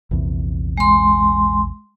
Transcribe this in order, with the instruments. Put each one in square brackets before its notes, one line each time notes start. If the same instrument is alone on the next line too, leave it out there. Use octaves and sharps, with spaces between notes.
[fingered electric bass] A#1 E2 C3
[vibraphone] G#3 C6